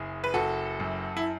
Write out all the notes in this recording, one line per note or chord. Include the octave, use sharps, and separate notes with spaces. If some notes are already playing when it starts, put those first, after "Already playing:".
Already playing: F#1 G#4
B4
F#1 F#4 A4
F#2
E4